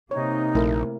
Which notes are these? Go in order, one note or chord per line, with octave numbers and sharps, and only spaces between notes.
C3 A#3 D#4 C#5
A#1 A3 E4 A#4